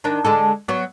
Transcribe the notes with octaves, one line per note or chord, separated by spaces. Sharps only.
D#3 D4
D3 G#3 A4
F#3 B3